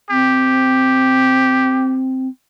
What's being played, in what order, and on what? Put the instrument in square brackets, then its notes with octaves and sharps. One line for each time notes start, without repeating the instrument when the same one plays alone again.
[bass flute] C4 [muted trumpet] G4